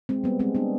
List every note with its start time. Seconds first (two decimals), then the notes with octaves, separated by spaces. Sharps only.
0.09 G#3 C4
0.24 G3 B3
0.39 G#3 C4
0.55 B3 D4